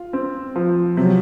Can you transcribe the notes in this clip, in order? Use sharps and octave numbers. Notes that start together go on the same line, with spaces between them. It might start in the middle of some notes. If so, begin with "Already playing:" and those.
Already playing: F4
C4
F3
C3 F#3